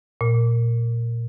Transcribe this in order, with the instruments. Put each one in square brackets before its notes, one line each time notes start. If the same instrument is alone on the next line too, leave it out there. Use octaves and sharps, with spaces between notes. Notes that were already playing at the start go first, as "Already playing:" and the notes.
[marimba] A#2